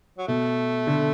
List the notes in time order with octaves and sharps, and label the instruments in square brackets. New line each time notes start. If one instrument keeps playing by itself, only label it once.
[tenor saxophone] F#3
[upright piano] B2 [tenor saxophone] A3
[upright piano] D3